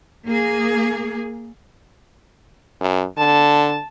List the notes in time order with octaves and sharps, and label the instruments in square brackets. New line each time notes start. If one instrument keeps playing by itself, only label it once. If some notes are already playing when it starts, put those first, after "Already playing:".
[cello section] A#3 G#4
[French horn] F#2
[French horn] D3 [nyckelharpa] A5